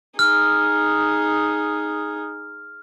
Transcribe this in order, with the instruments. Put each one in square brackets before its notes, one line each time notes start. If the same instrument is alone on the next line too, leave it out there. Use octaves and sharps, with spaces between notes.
[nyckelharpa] D#4 G#4 [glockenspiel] F6